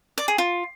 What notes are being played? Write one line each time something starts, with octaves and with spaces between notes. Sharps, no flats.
D5
G#4
F4